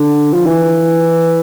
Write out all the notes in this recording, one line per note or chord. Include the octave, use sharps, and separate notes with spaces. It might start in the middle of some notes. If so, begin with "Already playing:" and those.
Already playing: D3
F3
E3